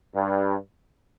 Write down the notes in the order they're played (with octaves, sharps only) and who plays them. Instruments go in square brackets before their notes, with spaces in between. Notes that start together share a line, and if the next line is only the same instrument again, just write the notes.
[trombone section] G2